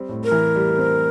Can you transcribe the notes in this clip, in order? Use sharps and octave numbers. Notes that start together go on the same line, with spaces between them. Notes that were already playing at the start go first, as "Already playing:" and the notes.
Already playing: G3 C4
A2
A#4
E3
G3
C4